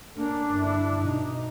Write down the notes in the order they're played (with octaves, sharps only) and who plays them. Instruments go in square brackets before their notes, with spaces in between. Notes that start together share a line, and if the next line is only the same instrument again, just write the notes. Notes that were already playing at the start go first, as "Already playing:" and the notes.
[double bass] A#3 C#4 [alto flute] D4
[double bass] G1 E4
B2 D#4